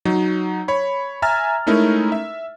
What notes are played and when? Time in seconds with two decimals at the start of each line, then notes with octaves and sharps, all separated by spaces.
0.05 F#3 D#4
0.68 C#5 B5
1.22 E5 G#5 A#5 F6 A6
1.66 G#3 A3 C#4 D#4 E4 A#4
2.12 E5